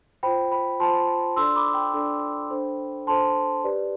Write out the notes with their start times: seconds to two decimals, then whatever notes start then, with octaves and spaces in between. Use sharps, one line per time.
0.23 F4 C5 G5 B5
0.52 G5 B5
0.80 F4 C5 A5 C6
1.36 D4 A4 D5 C6 E6
1.56 B5 D6
1.74 G5 B5
1.93 D4 A4 D5
2.50 D4 A4 C5
3.07 D4 A4 C5 A5 C6
3.64 G4 B4 D5